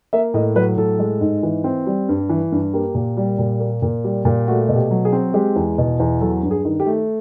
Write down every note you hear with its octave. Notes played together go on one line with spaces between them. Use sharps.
A#3 E5
A2 D#5
F#3 B4
A2 A4
G#3
G#2
E3
C4
G3
G2
E3
G2
A#3 G4
A#2
G3
A#2
A#3
A#2
G3
A#2
A3 F#4
B2
G4
F#3
G#4
C4
G#3 G4
E2
B2
E2
F#3 A4
G2
G#4
D#3
G4
A3